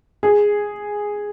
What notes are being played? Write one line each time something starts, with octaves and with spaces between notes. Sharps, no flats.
G#4